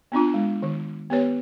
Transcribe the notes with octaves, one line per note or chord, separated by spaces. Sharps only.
B3 C4 D4 F4
G#3
D#3
B3 G4 B4 C#5